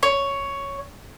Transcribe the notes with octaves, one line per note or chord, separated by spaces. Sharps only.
C#5